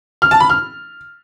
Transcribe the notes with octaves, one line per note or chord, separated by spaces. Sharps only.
F6
A5
B5
F6